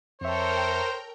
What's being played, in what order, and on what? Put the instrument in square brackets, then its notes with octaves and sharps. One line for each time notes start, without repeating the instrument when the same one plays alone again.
[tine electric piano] F2 E5 [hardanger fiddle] A4 C#5 [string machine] A#4 G5 A#5 [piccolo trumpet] C5